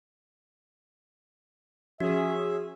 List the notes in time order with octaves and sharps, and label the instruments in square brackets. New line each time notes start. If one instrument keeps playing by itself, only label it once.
[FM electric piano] F3 [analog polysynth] C#4 G#4 [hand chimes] F#4 [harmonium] E5